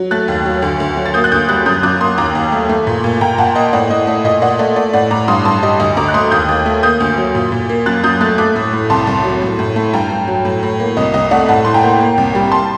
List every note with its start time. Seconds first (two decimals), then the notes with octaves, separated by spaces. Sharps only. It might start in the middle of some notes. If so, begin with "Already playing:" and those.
Already playing: F#3
0.11 A3 F#6 A6
0.28 D#2
0.45 F#3
0.62 D2
0.80 D2
0.97 F#3
1.06 A6
1.14 A#3 D#6 G6
1.24 F#6
1.32 D2 D#6 G6
1.49 G3 F#6 A6
1.66 F#2 D#6 G6
1.83 F#2 D6 F#6
2.00 A#3 C6 D#6
2.18 D#2 A#5 D6
2.35 D#2
2.52 A3
2.69 A3
2.87 A#2
3.04 A#2
3.21 A#2 G5 A#5
3.38 A#2 F#5 A5
3.55 A#3 D#5 G5
3.73 A2 D5 F#5
3.90 A2 D#5
4.07 A3 D5
4.24 A#2 D#5
4.42 A#2 D5 F#5
4.59 A3 D5
4.76 A3 D5
4.93 A2 D5 F#5
5.11 A2 A#5 D6
5.28 G2 C6 D#6
5.45 G2 A5 C6
5.63 G3 D#5
5.80 D2 D#5
5.97 D2 A#5 D6
6.08 F#6
6.14 A3 C6 D#6
6.31 D#2 D#6 G6
6.49 D#2
6.66 A3
6.83 A#3 D#6 G6
7.00 D2
7.17 F#3
7.35 A#2
7.52 A#2
7.69 A#3
7.86 F#2 F#6 A6
8.03 F#2 D#6 G6
8.21 A3 F#6 A6
8.38 A3 D6 F#6
8.55 A2
8.73 A2
8.90 C2 A5 C6
9.07 C2
9.24 F#3
9.42 A2
9.59 A2
9.76 A3
9.93 G2 G5 A#5
10.11 G2
10.28 F#3
10.45 A2
10.63 A2
10.80 A#3
10.97 C2 D#5
11.14 C2 D#5
11.31 A3 D5 F#5
11.48 A2 F#5 A5
11.65 A2 C6
11.74 G5 A#5
11.83 A#3
12.00 A#3
12.18 C2
12.35 G3
12.52 A5 C6